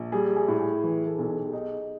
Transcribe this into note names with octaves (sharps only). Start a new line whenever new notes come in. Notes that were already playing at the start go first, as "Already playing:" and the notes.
Already playing: A#1
G3 G#4
G#4
A2
G#4
E3 G#4
A4
G#4
B1 A4
G#4
G4
D#4 G#4